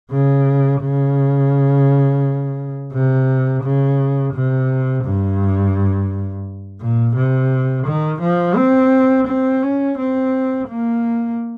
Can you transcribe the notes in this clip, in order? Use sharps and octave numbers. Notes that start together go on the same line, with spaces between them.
C#3
C#3
C3
C#3
C3
G2
A#2
C3
D#3
F3
C4
C4
C#4
C4
A#3